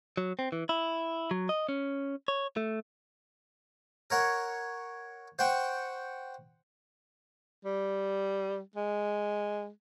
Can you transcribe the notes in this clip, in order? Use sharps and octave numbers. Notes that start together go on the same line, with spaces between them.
F#3
C4
E3
E4
F#3
D#5
C#4
C#5
A3
A#4 C#5 F#5
C5 F#5 G5 C#6
G3
G#3